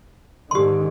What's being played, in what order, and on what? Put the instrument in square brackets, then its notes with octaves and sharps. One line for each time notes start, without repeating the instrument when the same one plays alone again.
[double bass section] G#2 D3 D#3 [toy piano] G4 C6